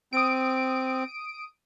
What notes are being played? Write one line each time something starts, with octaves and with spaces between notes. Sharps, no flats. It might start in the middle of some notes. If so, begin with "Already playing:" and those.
C4 D#6 D7